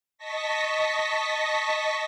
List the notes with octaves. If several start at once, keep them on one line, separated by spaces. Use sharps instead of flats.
D#5 A5 C#6 A#6 B6